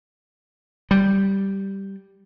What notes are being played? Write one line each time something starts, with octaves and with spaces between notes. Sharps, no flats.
G3